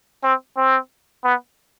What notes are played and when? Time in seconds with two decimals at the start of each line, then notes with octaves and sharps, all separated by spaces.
0.23 C4
0.57 C4
1.24 B3